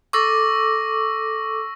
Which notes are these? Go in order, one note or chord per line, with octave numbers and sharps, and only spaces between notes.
A4 C#6 D6 E6 A#6